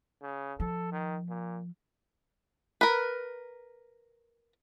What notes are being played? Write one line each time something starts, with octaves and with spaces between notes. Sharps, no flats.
C#3
F3 A4
D#3
A#2
A#4 B4